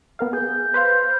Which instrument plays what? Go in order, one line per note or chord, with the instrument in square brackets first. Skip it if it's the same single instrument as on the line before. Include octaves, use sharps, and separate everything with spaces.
[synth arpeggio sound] B3 A#4 F5
[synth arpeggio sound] G#4 [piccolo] G6
[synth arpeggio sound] B4 C5 F5